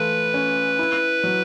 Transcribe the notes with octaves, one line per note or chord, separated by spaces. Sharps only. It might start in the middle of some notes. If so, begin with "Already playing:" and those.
Already playing: E3 A3 F4 B4
C#4
E4
F#3